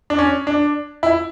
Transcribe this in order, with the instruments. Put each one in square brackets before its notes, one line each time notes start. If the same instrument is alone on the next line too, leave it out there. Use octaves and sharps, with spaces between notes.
[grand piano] D4
C#4
D4
E4